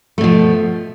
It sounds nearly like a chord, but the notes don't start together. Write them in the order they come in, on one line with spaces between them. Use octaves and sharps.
A3 B2 F3